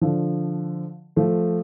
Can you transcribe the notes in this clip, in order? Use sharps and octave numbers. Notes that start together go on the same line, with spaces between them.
D3 F3
F3 A3